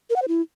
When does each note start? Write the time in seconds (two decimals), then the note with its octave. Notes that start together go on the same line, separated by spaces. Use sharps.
0.10 A#4
0.16 F#5
0.22 C5
0.28 E4